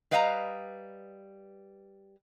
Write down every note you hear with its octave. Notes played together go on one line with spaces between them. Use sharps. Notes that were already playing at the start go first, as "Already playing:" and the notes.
G3 B4 D#5 F5 A5 A#5